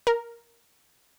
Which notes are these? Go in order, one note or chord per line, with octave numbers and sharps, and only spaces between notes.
A#4